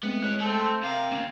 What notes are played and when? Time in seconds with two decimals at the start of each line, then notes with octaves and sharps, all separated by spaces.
0.03 G#3 A3 B3 C4
0.22 G#3 E4 C#5 F#6
0.40 A3 C4 A4
0.58 C6 E6 G6
0.83 C3 A#4 F5
1.12 D#2 G#2 C#4